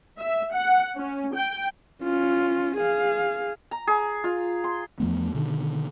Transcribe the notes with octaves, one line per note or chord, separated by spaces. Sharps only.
E5
F#5
C#4
G5
C#4 F4
G#4 F5
A#5
G#4
F4
C6
E2 F3 A3 B3
B2 D3 D#3